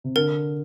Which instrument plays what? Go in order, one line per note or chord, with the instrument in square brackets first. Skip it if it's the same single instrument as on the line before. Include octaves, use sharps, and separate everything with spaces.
[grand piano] C3
[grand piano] D3 [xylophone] A#4